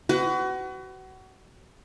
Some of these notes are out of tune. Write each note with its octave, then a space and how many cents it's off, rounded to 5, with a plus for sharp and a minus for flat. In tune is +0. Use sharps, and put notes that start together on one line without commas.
F#4 +30 B4 +35